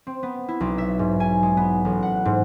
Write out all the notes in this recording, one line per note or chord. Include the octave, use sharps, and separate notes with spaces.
C4
B3
E4
B1
E5
G#2
G#5
G#3
B3
A1
F#5
G#2